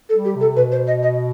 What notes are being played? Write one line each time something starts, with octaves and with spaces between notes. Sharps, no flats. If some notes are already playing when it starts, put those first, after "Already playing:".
A4
G3
G4
C3
A4
B2 B4
C5
D#5
D#5